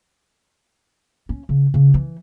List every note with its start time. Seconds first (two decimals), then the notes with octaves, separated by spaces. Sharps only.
1.29 C#4
1.49 C#3
1.74 C#3
1.94 E3